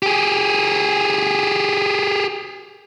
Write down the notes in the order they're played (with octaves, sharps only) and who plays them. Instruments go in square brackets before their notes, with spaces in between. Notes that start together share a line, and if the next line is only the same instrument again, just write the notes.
[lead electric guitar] G4 G#4